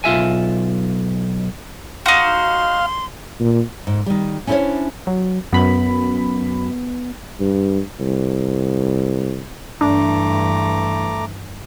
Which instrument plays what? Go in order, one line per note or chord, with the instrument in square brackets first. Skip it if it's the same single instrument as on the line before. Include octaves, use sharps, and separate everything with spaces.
[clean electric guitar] B1 F4 E5 G#5
[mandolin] D#4 F#4 [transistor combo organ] F5 [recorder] C6
[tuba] A#2
[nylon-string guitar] G#2
D#3 G3
C#4 D4 E4 A4 C5 C#5
[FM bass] F#3
[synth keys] F#2 B5 [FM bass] B3
[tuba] G2
C2
[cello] G2 E3 [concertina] A3 A#5 D6 [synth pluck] D4